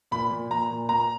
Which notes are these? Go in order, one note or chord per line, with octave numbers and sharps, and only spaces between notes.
A#2 B5
A#2
A#2 A#5
A#2
A#2 A#5